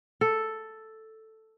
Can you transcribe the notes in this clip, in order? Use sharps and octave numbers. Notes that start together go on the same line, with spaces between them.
A4